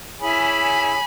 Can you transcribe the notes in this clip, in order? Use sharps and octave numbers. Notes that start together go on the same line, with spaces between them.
E4 G#4 C#5 G#5 B5